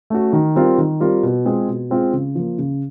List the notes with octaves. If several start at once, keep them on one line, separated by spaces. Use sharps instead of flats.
A3 C#4 F#4
D#3
G3 C4 F4 A#4
D#3
G3 C4 F4 A#4
B2
G#3 C4 F4 G#4
B2
G#3 C4 F4 G#4
C#3
F3 A#3
C#3